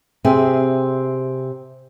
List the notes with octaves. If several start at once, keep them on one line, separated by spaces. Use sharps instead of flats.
C3 C4 G#4 E5